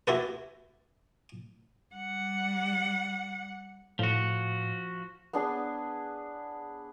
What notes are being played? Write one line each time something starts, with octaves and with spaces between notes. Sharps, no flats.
E4 F#4 G4 A4 B4
G3 F#5
A2 F3 F#4
B3 D4 G#4